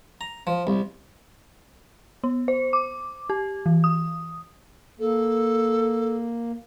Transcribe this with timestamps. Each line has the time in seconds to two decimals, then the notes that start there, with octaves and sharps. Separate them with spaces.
0.21 A#5
0.47 F3
0.67 C2
2.24 B3
2.48 C5
2.73 D6
3.30 G4
3.66 E3
3.84 D#6
5.00 A#3 A4